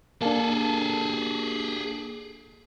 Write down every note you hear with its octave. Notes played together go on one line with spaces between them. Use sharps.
A#3 D4 G#4 A4